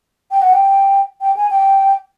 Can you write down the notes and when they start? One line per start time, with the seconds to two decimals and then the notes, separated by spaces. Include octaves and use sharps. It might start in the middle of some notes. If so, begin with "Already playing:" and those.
0.31 G5
0.42 F#5
0.53 G5
1.21 G5
1.36 G#5
1.50 G5